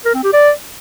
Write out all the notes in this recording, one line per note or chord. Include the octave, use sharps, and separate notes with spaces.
A#4
C4
G4
D5